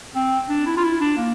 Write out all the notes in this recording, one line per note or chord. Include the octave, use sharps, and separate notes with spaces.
C4
D4
E4
F4
E4
D4
A#3